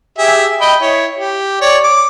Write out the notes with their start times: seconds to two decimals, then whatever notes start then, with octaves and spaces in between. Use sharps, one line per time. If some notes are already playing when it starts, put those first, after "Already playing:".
0.18 G4 G#4 E5
0.61 D#5 G5 B5
0.82 E4 C#5
1.18 G4
1.61 C#5 D5
1.84 D6